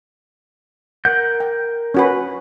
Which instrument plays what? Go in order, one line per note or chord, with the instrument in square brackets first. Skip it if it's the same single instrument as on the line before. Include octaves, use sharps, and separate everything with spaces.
[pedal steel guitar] A#4 G6 [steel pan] F#5
[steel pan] G5
C#4 F#4 B4